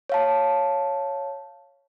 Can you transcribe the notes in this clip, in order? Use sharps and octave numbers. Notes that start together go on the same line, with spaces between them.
C#5 F5 A5